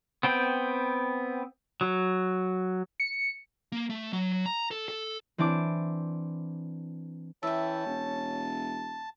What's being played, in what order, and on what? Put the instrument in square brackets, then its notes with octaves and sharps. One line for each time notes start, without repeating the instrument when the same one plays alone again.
[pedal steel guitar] B3 C4 G5
F#3
[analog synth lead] C#7
[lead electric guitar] A#3
A3
F#3
A#5
A4
A4
[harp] E3 C4 D4 D6
[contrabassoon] E3 [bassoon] C#4 [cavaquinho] E5 G5 [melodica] A5
[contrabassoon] E1